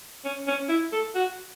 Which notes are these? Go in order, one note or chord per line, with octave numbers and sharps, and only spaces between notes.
C#4
C#4
E4
A4
F#4